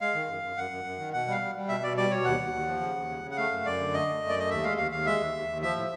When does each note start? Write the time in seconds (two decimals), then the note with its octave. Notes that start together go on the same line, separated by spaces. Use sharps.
0.01 G#3 F5
0.15 D#3
0.28 F#2
0.43 F#2
0.56 F#2 F#5
0.71 F#2
0.84 F#2
0.99 D#3
1.13 B2 F#5
1.27 G3 F5
1.41 G3
1.55 G3
1.69 B2 E5
1.83 B2 D5
1.97 G3 D5
2.11 B2 C#5
2.25 D#2 F#5
2.40 D#2
2.53 D#2
2.68 F3
2.81 C#3
2.96 D#2
3.09 C#3
3.23 C#3
3.31 F#5
3.37 A3 F5
3.52 F#2
3.66 F#2 D5
3.79 D3
3.93 A3 D#5
4.08 A3
4.22 F#2
4.29 D5
4.36 A3 D#5
4.50 D#2 E5
4.63 G#3 F5
4.77 D#2 F5
4.91 D#2 F5
5.06 G#3 E5
5.20 D#2
5.34 D#2
5.49 D#2
5.62 F3 E5
5.77 A2